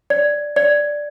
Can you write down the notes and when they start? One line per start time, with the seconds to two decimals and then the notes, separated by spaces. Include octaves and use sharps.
0.10 D5
0.56 D5